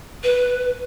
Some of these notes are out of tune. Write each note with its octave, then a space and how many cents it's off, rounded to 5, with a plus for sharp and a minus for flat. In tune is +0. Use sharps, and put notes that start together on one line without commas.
B4 +0